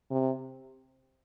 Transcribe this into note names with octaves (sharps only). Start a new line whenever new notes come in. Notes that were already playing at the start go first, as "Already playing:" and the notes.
C3